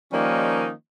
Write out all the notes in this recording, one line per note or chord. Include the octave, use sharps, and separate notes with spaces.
D#3 F3 G3 A#3 C#4 D#4